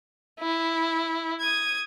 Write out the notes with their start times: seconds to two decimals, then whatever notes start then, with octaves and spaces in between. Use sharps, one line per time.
0.40 E4
1.41 D#6 G#6